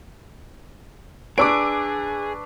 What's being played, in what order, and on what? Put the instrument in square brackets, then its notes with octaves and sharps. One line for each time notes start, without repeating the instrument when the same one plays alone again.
[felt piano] D4 B4 C#6 [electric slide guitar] G#4 [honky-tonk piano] D6 E6 D7